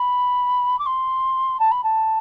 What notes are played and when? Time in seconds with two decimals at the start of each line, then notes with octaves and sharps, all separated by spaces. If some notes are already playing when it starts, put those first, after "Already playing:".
Already playing: B5
0.79 D6
0.86 C6
1.59 A5
1.71 B5
1.83 A5